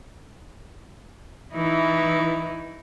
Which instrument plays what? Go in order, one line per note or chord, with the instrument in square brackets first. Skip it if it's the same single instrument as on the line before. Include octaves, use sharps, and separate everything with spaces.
[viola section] E3 [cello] D#4 E4